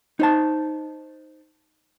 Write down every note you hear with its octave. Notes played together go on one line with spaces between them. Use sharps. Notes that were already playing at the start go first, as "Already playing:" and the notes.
D#4 C5 A5